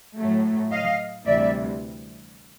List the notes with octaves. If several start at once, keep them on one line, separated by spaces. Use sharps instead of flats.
A2 F#3 A3
D#5 F5
D2 C3 E3 G3 D5 E5